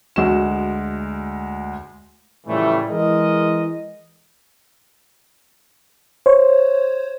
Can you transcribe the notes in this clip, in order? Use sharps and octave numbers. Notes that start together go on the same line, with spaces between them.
D2 G#3 F#4 E7
A2 C#3 E3 F3 G3 A3
E3 G#3 A#4 D#5
C5 C#5